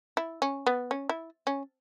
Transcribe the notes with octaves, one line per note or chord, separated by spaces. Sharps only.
E4
C#4
B3
C#4
E4
C#4